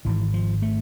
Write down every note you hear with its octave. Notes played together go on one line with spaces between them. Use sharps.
G#1 G#2 E3
F3
A3